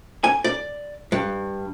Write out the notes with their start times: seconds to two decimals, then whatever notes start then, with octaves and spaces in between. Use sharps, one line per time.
0.24 G#5
0.44 D5
1.12 G2